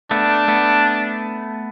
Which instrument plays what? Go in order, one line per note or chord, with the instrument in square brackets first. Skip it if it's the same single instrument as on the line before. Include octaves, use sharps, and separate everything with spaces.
[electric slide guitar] A3 B3 [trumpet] D4
[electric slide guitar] A3 B3